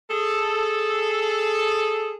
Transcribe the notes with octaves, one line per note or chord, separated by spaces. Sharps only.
G#4 A4